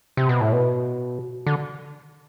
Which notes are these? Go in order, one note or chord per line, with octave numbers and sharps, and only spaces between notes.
C3
B2
A2
B2
D3